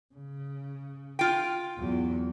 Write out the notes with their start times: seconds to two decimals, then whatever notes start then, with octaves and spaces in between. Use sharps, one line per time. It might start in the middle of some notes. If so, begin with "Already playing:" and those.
0.14 C#3
1.19 F4 G5
1.78 E2 F#3